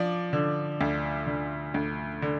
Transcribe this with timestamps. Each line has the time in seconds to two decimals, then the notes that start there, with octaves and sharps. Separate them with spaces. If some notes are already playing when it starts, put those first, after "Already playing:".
Already playing: F3 D5
0.33 D3
0.81 D2
1.27 D3
1.74 D2
2.22 D3